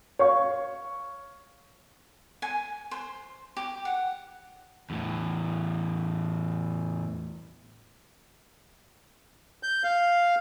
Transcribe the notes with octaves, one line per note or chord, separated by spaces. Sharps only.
C#5 F5 C#6
G#5
C5
G4
F#5
E2 A2
G6
F5